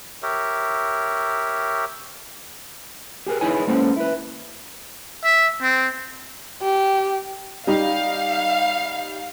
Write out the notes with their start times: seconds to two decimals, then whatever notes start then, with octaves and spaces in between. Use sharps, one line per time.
0.23 G4 A#4 C#5 E5
3.27 G4 G#4 A#4 B4
3.41 D#4 E4 G#4 B4 C#5 G#5
3.67 G#3 A#3 B3 C#4 A4 C5
3.96 E4 B4
5.24 E5
5.62 C4
6.62 G4
7.67 G3 D#4 G4 F5